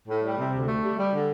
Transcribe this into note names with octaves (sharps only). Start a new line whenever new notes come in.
A2
G3
C3
D2
A3
G3
G3
D3